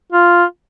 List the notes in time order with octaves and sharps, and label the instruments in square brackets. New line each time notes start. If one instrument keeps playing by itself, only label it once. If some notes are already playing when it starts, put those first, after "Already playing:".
[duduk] F4